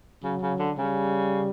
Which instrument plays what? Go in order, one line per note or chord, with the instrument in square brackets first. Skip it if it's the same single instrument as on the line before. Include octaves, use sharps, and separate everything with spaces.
[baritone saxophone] C#3 [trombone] F#3
[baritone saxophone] C#3
D3
[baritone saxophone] C#3 [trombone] G3